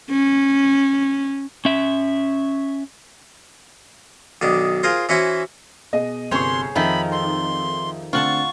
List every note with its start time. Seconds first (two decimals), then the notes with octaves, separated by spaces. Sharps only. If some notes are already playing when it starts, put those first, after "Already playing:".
0.10 C#4
1.65 C#4 E5
4.41 B1 D#3 D4
4.83 F4 G#4 A#4 C5
5.09 E3 C#4 E4 F#4 C5 E5
5.93 B2 G#4 D#5
6.31 G1 C3 G#4 C5 C#5 C6 C#6
6.75 F2 D#3 F3 D#4 E5 B5 E6
7.12 C6
8.13 D3 A3 C4 F4 F#5 A5 C#6